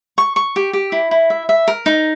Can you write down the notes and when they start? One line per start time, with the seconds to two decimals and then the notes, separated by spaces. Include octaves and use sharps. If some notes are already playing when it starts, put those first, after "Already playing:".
0.18 C#6
0.36 C#6
0.56 G4
0.73 G4
0.92 E4
1.11 E4
1.30 E5
1.49 E5
1.68 A#4
1.86 D#4